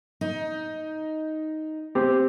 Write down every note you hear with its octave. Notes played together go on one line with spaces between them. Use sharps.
D#4
C4 G4